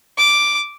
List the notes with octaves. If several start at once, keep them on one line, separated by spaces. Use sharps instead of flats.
D6